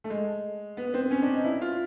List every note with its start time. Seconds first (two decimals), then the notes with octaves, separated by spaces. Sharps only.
0.04 A3
0.10 G#3
0.77 B3
0.94 C4
1.11 C#4
1.22 D4
1.33 D#4
1.45 E4
1.61 F4